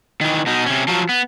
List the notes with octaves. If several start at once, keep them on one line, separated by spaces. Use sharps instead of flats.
D#3 E3
B2 D#4
C3 C#4
F3 F#3
B3